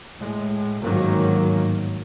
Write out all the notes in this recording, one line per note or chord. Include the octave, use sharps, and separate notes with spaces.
A2 G#3
G1 G#2 D#3 F#3 A#3